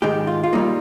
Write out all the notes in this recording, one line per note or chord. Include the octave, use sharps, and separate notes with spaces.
G#2 D#3 G#3 G4
F4
F4
A#2 G3 A#3 D#4